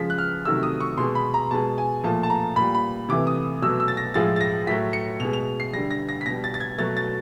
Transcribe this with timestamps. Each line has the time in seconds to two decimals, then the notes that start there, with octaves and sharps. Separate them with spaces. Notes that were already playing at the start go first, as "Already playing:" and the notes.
Already playing: C#3 F3 G#3 B6
0.10 F#6
0.18 F6
0.45 C3 D#3 F#3 A3 E6
0.63 D#6
0.80 C#6
0.98 B2 G#3 C6
1.15 B5
1.34 A#5
1.51 B2 G#3 A5
1.78 G#5
2.03 A#2 F3 A3 A5
2.23 A5
2.30 A#5
2.56 A#2 G3 B5
2.75 B5
3.09 C3 E3 A3 D6
3.27 D#6
3.62 B2 F#3 A3 E6
3.80 E6
3.88 A6
3.97 A#6
4.14 A2 F3 G#3 A6
4.36 A6
4.41 A#6
4.67 A2 F#3 A3 B6
4.93 C#7
5.20 B2 G#3 F7
5.33 F7
5.60 C7
5.73 D3 G3 A#6
5.91 A#6
6.09 A#6
6.21 B6
6.26 B2 G3 A#6
6.44 A6
6.54 A6
6.60 G#6
6.78 B2 F#3 A3 A6
6.97 A6